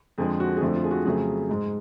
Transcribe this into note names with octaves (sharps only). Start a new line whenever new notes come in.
F2 D3 F3 G#3 G#4
F#4
G#4
F2 D3 F3 A3 F#4
F4
G#4
F#4
F2 C#3 F#3 A3 G#4
G#2 G#3